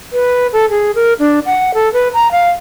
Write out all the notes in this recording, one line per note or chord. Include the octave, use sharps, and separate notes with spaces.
B4
A4
G#4
A#4
D4
F#5
A4
B4
A#5
F5